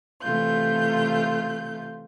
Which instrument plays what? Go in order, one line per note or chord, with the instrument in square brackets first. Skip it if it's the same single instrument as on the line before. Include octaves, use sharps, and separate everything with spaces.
[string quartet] C3 E3 A3 F4 G6